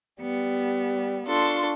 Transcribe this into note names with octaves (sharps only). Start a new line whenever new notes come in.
G3 B3
D4 F4 A4 C6 C#6